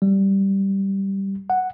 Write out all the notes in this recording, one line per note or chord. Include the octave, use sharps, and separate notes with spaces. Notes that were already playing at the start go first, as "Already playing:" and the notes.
G3
F#5